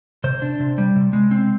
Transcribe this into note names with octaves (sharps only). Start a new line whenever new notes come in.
C3 C5
D4
C3
G3
C3
G#3
C4